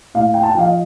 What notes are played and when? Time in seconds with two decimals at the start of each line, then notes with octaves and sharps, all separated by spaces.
0.14 A2 F5
0.34 G5
0.43 A5
0.51 G5
0.55 F3 F5
0.66 D#5